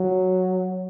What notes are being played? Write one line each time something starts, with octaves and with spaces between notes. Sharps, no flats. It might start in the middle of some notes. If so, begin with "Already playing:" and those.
Already playing: F#3